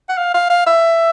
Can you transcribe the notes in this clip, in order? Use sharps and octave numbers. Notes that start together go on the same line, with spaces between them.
F#5
F5
F5
F5
E5